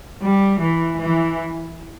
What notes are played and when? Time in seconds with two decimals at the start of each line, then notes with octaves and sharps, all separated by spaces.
0.22 G3
0.61 E3
1.00 E3